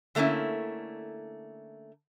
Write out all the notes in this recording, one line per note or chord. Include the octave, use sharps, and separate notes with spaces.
D3 A3 A#3 C#4 E4